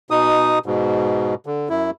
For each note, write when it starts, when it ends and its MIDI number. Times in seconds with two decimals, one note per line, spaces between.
0.10 0.59 47
0.10 0.59 63
0.10 0.59 87
0.66 1.34 44
0.66 1.34 47
1.46 1.69 50
1.69 1.91 42
1.69 1.91 64